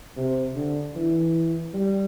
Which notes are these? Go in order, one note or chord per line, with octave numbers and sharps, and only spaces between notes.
C3
D3
E3
G3